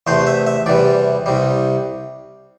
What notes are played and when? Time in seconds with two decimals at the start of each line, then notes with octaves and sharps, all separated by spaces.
0.07 E2 C3 A3 C5
0.27 E5
0.47 E5
0.66 E2 C3 E3 G3 D5
1.26 C2 C3 G3